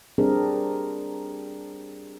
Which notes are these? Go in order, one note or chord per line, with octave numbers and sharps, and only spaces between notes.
G3 C4 D4 G#4 A#4